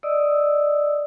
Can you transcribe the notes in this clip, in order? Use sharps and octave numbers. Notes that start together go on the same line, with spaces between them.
D5 D#5 D#6 E6